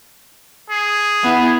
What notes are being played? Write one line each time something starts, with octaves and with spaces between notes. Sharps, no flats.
G#4
B3 E4